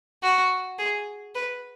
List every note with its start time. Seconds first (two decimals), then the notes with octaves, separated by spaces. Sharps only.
0.23 F#4
0.79 G#4
1.35 B4